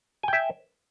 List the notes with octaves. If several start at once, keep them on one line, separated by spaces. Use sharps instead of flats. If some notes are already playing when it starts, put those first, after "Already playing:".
E5 G5 G#5